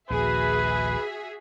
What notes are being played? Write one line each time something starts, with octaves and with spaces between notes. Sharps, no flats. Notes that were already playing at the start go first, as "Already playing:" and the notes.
A#1 D#2 D#3 F#4 G#4 B4 E5